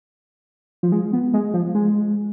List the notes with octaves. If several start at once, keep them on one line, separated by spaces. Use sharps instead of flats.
F3
G#3
B3
G#3
F3
G#3